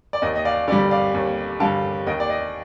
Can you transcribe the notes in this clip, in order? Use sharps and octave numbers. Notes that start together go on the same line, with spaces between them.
D5
D#2 D#5
D#5
D5 F5
D3 G3 D5
D5 F5
D#2
D3 G3 F5 A5
D#2 D#5 G5
D5
D#5